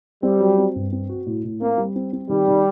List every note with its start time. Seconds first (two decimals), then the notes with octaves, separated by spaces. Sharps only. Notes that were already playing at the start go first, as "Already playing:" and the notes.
0.23 G3 C4
0.40 F#3
0.58 C4
0.75 G2
0.92 C4
1.09 F#4
1.26 A2
1.44 A2
1.61 A#3 C4
1.78 G3
1.96 C4
2.13 C4
2.29 D#3 G3
2.48 D#3